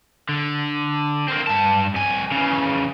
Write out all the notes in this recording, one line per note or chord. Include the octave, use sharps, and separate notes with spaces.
D3
A#3 C4
G2 A5
C2 G#5
C#3 E3